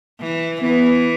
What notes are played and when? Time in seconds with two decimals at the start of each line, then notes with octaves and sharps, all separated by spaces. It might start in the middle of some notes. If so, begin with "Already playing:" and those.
0.20 E3
0.62 E3 B3